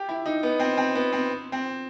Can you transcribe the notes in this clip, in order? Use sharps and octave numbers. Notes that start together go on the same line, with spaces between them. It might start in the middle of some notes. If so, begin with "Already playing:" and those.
Already playing: G4
E4
D#4
B3
C4
C4
B3
C4
C4